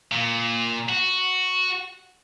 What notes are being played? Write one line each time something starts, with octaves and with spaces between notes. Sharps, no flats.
A#2
F#4